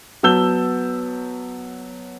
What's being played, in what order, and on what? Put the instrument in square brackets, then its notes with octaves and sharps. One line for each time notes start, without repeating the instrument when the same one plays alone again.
[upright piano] F#3 B3 A5 E6 G6 G7